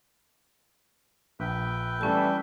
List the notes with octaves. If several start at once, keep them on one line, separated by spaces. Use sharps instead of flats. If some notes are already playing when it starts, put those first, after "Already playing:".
A#1 B4 E5 G5
E3 G3 A3 C#4 A5